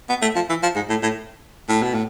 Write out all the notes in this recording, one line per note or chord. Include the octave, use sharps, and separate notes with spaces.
B3
A3
F3
E3
F3
G#2
A2
A2
A2
B2
A2